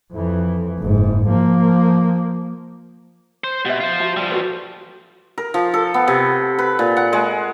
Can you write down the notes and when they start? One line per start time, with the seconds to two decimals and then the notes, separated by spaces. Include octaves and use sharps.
0.13 F2 E3
0.79 F#1 G#2
1.29 F3 A#3
3.44 C5
3.65 B2 G4 E5
3.81 F4 C5
4.00 F#4 A5
4.17 F3 G3
4.30 F#4 A4 B4
5.38 A#4
5.54 F3
5.74 A4
5.94 B3
6.08 C3
6.59 B4
6.79 A#2
6.97 F#5
7.13 G#3